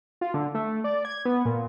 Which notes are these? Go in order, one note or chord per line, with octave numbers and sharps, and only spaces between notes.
F4
D3
A3
D5
G#6
B3
A#2